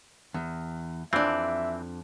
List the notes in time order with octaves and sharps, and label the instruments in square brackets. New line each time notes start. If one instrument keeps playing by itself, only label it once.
[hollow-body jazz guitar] E2
[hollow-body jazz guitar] F2 D4 [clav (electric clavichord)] E3 C4 [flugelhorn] E5